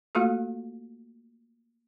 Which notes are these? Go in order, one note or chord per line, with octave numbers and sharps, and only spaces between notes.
A3 A#3 F4 F#4 A4